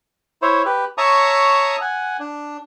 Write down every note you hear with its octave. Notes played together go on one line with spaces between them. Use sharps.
E4 C5 C#5
G4 B4
C#5 E5 A5 A#5 C#6 D#6
F#5 G#5
D4